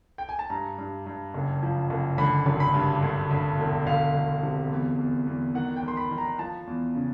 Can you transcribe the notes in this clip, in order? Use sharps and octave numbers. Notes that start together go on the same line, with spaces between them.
G5
G#5
A5
G2 A#5
G2
G2
F#1
F3
F#1
D3 B5
G#1
B5
G2
D2
D2
E1
D2 F5
D2
C3
E2
E2
E2
D#3 F#5
G5
D#3 C6
B5
D#3
A#5
F3 A5
E2
C#3